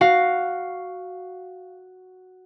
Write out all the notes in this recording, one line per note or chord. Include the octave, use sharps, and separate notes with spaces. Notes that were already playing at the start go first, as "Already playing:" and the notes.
F#4 F5